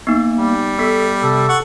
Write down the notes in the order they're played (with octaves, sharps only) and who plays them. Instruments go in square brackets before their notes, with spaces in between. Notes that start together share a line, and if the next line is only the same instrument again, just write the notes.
[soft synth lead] A#3 [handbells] B3 D#4
[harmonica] G3
[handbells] B3 B6 [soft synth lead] A4
[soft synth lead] C3 [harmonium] A4
[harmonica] F#5 C#6